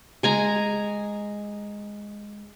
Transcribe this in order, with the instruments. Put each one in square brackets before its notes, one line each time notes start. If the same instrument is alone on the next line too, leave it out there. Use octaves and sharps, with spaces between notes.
[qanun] G#3 G#5 A#5